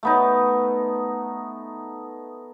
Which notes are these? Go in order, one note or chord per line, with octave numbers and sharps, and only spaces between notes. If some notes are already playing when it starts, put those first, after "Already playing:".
A3 B3 D#4